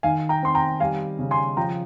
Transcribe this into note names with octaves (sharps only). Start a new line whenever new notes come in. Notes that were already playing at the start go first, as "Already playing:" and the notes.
D#3 F5 G#5
G5 A#5
C4 C6
G5 A#5
G3 F5 G#5
C#3
G#5 C6
F3 G5 A#5